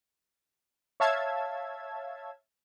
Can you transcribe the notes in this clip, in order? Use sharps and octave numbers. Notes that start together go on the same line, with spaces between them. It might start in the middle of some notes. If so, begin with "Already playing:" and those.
C#5 E5 F5 A5 E6 G#6